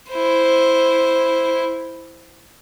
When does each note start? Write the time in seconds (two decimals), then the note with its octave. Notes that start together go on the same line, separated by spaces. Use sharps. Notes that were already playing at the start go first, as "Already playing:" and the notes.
0.11 E4 C5